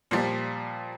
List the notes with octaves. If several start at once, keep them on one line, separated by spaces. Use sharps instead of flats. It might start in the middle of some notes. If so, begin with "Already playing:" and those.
A#2 F3 G3